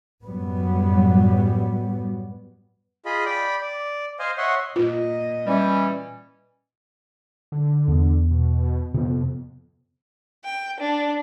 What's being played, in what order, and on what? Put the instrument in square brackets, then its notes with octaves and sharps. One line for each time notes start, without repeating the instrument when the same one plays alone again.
[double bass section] F#2 A2 F#3 G3 B3
[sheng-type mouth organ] F4 G#4 D#5 B5
D5 G5 B5
D5
C5 D#5 F5 G#5
C#5 D#5 E5 F#5 C6
[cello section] A#2 D#5 [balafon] F4
[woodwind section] E3 G3 C#4
[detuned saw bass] D3
[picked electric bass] E2 B3
[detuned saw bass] B2
[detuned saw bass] F2 [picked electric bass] C3 B3
[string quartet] G5
D4